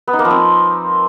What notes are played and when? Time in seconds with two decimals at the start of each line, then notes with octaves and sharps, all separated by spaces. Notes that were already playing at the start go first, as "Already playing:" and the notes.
0.08 B3
0.13 D#4
0.19 A#3
0.25 F3
0.30 C4